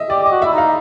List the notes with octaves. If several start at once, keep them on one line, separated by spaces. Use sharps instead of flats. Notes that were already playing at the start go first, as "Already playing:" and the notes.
Already playing: D#5 E5
G4 D5
G4 D#5
F#4
E4 E5
D#4 F5